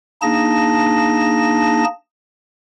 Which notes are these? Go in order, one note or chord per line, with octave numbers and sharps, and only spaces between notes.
A#3 D4 D#4 G#4 A5 A#6